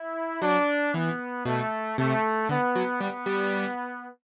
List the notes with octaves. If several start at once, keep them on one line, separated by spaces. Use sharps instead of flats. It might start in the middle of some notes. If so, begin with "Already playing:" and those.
Already playing: E4
F#3 D4
E3 B3
B2 A3
C3 A3
D3 B3
F#3
G3 B3
G3